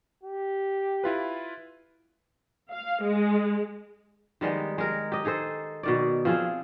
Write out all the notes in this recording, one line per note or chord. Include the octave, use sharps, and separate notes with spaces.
G4
E4 F4 B4
F5
G#3
D#3 G3 G#3 B3
G#3 A#4
G4 D#5
D#4 G#4 A4 C5
B2 D#3 D5
F3 C4 F4 G#4